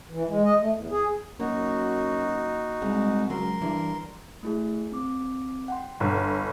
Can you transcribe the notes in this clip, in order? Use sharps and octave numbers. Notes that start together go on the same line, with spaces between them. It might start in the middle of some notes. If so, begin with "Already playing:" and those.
E3
G#3
D#5
A3
E2
G#4
F#2 A#3 D#4 F#4
C2 G#3
C#2 F#3 A#4 C6
G2 E3
A3 E4 G#4
C4 D6
F#5 G5 C6
G1 A#5